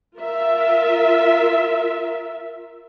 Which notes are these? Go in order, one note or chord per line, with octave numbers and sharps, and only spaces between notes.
F4 A#4 E5